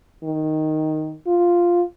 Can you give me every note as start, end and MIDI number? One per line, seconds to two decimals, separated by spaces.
0.24 1.14 51
1.27 1.82 65